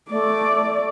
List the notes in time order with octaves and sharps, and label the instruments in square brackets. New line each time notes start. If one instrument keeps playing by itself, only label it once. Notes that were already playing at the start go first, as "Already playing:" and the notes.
[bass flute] A3 [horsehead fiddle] D5